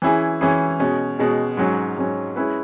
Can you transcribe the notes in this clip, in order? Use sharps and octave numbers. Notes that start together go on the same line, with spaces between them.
E3 C#4 E4 G#4
E3 C#4 E4 G#4
B2 G#3 C#4
B2 G#3 C#4
G#2 F#3 C#4
G#2 F#3 C#4
G#3 C#4 E4 B4